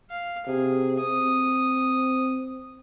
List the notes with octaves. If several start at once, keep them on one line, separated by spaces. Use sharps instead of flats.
F5
C3 G#4
C4 D#6